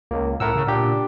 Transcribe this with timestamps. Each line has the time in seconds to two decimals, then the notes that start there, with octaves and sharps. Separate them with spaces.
0.11 C#2 A#3
0.40 A2 A#4 F#5 E6
0.55 C#3
0.68 A#2 D4 G4